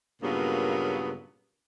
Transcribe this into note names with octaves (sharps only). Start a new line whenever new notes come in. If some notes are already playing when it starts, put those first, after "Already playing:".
G2 A#2 C#3 F#3 A#3 B3